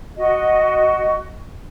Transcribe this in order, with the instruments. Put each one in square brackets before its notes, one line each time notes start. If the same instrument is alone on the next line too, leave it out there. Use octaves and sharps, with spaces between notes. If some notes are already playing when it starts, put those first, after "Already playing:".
[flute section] F#4 D#5